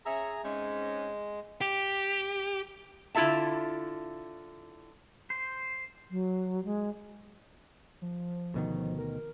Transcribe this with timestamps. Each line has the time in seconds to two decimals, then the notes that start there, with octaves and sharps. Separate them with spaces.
0.05 C#4 G#4 E5 A#5
0.44 G#2 G#3 C4 C#4
1.61 G4
3.15 D3 E4 F4 A4 E5 A5
5.30 C5
6.11 F#3
6.65 G#3
8.02 F3
8.54 D2 B2 D#3
8.98 A#4